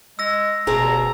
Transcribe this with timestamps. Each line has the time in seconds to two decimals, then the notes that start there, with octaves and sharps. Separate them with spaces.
0.19 G#3 E6 A#6
0.67 F1 B2 G#4 C5 A#5